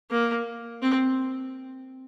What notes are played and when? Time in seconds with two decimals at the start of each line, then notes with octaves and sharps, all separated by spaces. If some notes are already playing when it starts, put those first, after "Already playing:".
0.11 A#3
0.83 C4